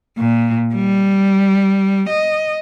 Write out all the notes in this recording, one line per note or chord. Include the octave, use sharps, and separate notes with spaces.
A#2
G3
D#5